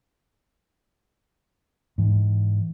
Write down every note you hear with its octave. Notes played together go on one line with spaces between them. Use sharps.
G#2 E3